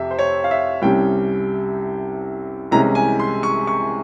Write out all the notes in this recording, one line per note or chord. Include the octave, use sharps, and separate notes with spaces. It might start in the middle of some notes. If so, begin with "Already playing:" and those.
Already playing: F2 C3 E5
C5
C#5
F5
E5
C2 C3 G3 C#4 G5
C2 C3 E3 G#3 C#4 A#5
G#5
C6
C#6
C#6